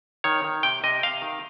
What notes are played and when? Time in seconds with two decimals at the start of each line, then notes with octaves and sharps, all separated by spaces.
0.24 D#3 C#5
0.44 D#3
0.63 C3 G5
0.84 C3 D#5
1.03 C3 F5
1.22 D#3